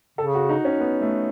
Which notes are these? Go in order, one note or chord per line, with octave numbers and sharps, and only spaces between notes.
C#3 A4
F#4
D#4
C#4
B3
A3